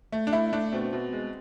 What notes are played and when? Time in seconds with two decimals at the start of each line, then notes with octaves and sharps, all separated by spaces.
0.12 A3
0.27 D4
0.33 A3 E4
0.53 A3 D4
0.73 B2 C4
0.93 B2
1.13 G#3